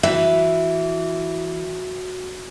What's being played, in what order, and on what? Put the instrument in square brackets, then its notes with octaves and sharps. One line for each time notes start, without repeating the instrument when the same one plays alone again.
[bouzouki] E3 [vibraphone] F#4 [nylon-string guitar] E5